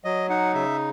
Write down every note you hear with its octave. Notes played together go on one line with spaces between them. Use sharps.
F#3 D#5
D#4 F#5
C#3 E5